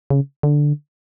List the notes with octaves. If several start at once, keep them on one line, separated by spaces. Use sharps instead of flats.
C#3
D3